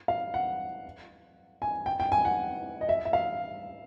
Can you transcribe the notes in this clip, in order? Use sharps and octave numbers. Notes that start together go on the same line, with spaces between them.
F5
F#5
G#5
G5
G5
G#5
F#5
D#5
E5
E5
F5